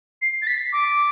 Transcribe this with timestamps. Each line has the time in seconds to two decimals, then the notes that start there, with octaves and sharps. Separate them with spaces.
0.22 C7
0.42 A6
0.47 B6
0.73 D6